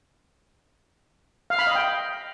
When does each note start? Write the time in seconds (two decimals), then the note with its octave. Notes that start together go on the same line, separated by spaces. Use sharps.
1.50 F5
1.59 B5
1.67 D#5
1.75 G5